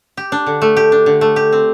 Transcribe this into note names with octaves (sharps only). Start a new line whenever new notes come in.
G4
D4
D3
A3
G4
D4
D3
A3
G4
C4